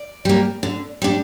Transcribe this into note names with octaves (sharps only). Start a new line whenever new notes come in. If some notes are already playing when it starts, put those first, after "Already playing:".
Already playing: D5
G3 A#3
D3
G3 D4